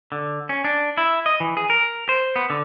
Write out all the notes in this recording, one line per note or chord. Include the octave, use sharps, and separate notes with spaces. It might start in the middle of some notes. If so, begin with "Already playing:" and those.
D3
C#4
D4
E4
D#5
E3
G#4
A#4
C5
B3
D3